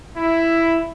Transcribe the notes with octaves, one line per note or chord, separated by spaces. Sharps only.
E4